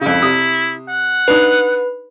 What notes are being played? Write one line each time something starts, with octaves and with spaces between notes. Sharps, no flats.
F2 C#3 E4
C3 D#6
F#5
D4 D#4 B4